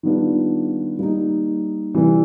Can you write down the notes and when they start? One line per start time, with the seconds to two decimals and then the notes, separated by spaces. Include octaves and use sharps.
0.03 D#3 G3 B3 D4 F4
0.99 G3 A#3 D#4
1.94 C3 E3 G3